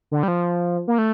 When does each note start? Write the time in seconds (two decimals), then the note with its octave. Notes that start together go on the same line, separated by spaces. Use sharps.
0.11 D3
0.23 G3
0.28 F3
0.88 A#3
0.98 A3